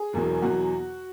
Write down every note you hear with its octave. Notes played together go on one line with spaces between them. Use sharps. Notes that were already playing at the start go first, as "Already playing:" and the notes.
Already playing: G#4
E1 E2 B2 F#3
E2 B2 F#3 F#4